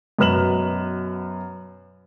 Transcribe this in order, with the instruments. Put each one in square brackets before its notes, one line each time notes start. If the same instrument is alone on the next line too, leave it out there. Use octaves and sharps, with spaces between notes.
[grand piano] F#2 B2 B4 F6 E7 F#7